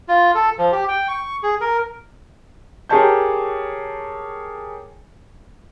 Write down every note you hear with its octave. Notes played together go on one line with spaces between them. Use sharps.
F4
A4
F3
G4
G5
C#6
G#4
A#4
G4 G#4 A#4 C#5 A5 G6